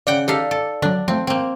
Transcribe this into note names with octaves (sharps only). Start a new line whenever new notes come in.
C#3 D5 F#5 G5
D#4 G4 A4 F5 B6
A4
D3 F#3 D4
F3 A3 C4
A#3 C4